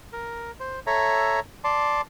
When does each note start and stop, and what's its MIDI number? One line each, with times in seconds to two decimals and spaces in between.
0.13 0.51 70
0.60 0.80 72
0.87 1.40 69
0.87 1.40 73
0.87 1.40 76
0.87 1.40 82
1.64 2.01 74
1.64 2.01 81
1.64 2.01 84